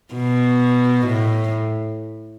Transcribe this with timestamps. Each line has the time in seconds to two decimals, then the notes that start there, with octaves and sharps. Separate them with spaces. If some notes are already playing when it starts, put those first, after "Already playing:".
0.15 B2
1.06 A2